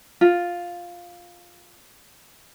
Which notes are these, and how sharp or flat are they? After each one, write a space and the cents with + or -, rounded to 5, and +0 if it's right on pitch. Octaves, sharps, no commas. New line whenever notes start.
F4 +5